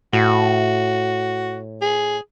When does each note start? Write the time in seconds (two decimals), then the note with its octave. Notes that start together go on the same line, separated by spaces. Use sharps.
0.13 A2 F#4
1.82 G#4